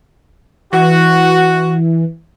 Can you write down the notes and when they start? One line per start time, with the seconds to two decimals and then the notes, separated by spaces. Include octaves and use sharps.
0.73 E3 F#4